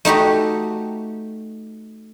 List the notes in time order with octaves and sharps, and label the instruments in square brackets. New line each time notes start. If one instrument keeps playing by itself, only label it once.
[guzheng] A3 D#4 F#4 G4